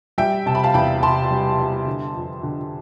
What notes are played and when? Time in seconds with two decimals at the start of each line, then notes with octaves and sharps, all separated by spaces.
0.18 G3 E5 G5
0.46 C3 A5
0.55 B5
0.64 F5 A5
0.74 E2 G5 B5
1.03 C3 A5 C6
1.31 G3
1.59 G3
1.86 D3
2.15 F2
2.43 D3